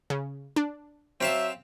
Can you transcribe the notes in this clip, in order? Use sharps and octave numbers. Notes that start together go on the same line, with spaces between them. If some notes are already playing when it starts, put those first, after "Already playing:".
C#3
D4
F#3 C4 E5 F5 A5